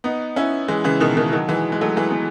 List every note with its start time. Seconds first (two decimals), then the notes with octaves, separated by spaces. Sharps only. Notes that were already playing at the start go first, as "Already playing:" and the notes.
0.04 B3 D#4
0.36 C#4 E4
0.68 E3 G#3
0.84 C#3 E3
1.00 B2 D#3
1.17 B2 D#3
1.32 D#3 F#3
1.48 E3 G#3
1.72 G#3
1.81 F#3 A3
1.97 E3 G#3
2.11 B3